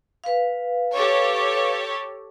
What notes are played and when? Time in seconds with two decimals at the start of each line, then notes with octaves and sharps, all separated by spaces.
0.24 B4 F5
0.93 G4 A4 C#5